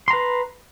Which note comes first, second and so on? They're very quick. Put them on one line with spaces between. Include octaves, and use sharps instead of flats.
C6 A#5 B4